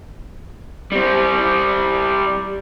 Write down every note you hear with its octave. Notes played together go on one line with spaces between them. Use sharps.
G3 C4